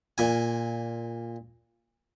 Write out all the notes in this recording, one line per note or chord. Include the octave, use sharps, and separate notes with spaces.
A#2 G#5